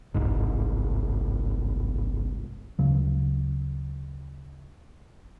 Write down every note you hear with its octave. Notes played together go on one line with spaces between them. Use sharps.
G1 C2 G#2
D2 C#3 F#3